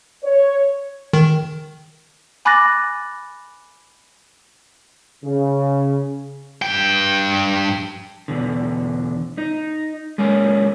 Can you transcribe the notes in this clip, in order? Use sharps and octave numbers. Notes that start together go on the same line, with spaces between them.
C#5
D#3
G#5 B5 D6 F#6 A6 A#6
C#3
G2 G5
E2 B2 D3
D#4
G#3 A#3 C#4